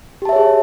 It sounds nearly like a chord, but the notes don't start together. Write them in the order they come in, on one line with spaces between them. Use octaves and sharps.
G4 A5 E5 C#5 G#4